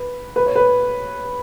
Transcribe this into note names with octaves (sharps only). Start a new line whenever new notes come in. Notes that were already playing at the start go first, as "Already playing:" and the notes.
Already playing: B4
B4
C#5
B4